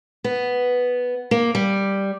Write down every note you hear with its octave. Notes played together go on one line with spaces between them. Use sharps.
B3
A#3
G3